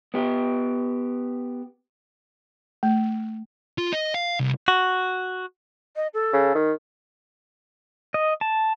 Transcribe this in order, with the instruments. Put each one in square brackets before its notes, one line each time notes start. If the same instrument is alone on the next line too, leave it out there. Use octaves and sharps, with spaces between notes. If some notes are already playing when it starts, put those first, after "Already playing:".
[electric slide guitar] B3 G4
[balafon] A3
[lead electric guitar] F4
D#5
F5
C2
[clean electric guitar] F#4
[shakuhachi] D#5
A4
[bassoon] C#3
D#3
[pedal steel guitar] D#5
A5